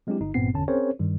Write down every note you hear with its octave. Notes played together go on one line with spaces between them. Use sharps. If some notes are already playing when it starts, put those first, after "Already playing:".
F#3 G#3 C4 D4 E4 G4
G1 D#4
G#1 G2 A#2 B3 C4 C7
G1 E2 D3 C#4 A5
C4 C#4 G#4 A#4 C5 C#5
G2 D#3 G3